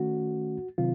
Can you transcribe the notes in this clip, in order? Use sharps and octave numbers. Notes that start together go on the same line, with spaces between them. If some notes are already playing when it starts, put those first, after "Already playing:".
Already playing: D#3 A3 C#4 F#4
C3 D#3 F#3 C4 F4